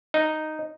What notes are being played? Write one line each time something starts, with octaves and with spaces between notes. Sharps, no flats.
D#4